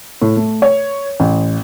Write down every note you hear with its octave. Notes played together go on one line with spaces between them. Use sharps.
A2
A3
C#5
A1